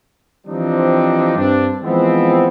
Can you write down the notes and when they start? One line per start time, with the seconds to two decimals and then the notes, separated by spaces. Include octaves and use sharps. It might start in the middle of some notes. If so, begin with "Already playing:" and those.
0.46 E3 F3 G3 C4 D4 D#4
1.35 G2 C4 D4
1.81 E3 F3 G#3 B3 C4